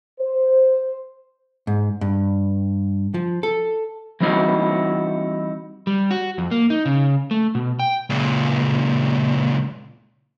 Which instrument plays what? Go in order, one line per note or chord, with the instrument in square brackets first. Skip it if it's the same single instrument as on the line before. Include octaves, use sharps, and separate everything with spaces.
[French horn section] C5
[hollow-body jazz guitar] G#2
G2
F3
A4
[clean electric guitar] E3 G3 C4 D#4 E4 F#4
[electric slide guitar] G3
F#4
F2
A#3
D#4
C#3
A3
B2
G5
[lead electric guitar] C#2 A#2